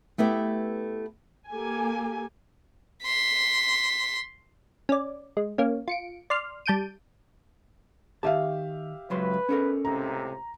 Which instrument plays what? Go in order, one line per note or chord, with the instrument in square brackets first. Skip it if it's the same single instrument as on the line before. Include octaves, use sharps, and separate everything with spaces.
[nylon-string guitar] A3 B3 E4 G4
[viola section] A#3 G4 A4 G#5
[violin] C6 B6
[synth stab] C#4 D5
G#3
A#3 C#4
F4 C#7 D7
D5 C6 F6
G3 A5 G6 D7 D#7
[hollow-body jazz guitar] D#3 A5 [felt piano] G4 E5 F5
[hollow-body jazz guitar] C#2 F#3 C6 [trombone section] B4
[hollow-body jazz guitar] C#4 A4 A#4
[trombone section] C#2 A2 C3 [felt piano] A#5